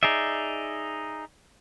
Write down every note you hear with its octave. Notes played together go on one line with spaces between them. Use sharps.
D#4 G#4 D5 E5